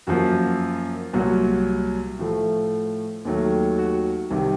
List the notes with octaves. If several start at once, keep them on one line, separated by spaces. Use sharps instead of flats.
F#2 F3 A#3 F#4
C2 A#2 F#3 F#4
A2 F3 A3
D#2 D#3 F#3 A3
F#4
C2 C3 D#3